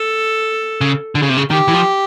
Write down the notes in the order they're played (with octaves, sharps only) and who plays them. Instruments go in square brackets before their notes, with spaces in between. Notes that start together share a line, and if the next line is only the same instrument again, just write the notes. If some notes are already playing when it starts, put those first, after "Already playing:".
Already playing: [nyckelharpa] A4
[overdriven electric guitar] C#3
D3
C#3
C3
C#3
[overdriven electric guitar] D#3 [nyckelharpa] G4
[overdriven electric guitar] E3
F3